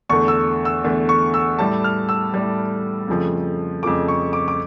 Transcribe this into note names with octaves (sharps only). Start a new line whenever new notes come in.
E2 D3 A3 C#6
E6
E6
E2 D3 A3
C#6
E6
A2 G3 A5
F6
E6
A2 G3
F2 C#3 F3 A3
F2 C#3 F3 A3 D6
C#6
D6
D6